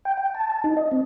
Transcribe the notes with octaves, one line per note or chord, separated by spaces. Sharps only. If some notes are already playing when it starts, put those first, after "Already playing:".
G5
G5
A5
A5
D#4
D#5
C4